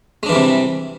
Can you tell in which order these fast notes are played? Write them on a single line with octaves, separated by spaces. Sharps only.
G#3 D4 E3 G3 C3